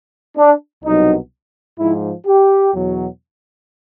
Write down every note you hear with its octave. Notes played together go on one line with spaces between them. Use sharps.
D4
C2 B2 F#3 D#4
G#2 F3 E4
G4
E2 B2 F#3